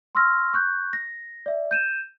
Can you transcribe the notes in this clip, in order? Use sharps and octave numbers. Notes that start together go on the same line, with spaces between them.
C6 C#6 E6 F6 A#6
C#6 F#6 G6
A#6
D5 E5
G6 D#7 E7